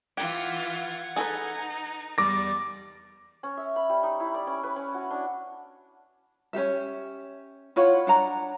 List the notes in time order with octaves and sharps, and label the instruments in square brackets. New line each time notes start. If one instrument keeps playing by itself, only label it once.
[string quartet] E3 F4 [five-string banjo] G4 [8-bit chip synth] F#5 G#6
[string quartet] D#4 [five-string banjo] G#4 A4 B4
[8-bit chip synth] E2 G3 A6 [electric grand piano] D6 A#6
[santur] C#4
E5
B5
G3
D#4
E4
D5
C#4
B4
C#4
F#4
D4
[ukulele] C#4 D4 G4 E5
E4 F4 C#5 F#5
D4 F#5 A#5